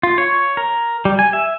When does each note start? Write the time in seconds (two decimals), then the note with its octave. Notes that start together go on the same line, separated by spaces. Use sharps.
0.03 F4
0.18 C#5
0.57 A#4
1.05 G3
1.19 G#5
1.33 E5